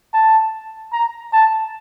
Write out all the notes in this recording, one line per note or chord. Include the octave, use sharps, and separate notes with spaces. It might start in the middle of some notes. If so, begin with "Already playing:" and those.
A5
A#5
A5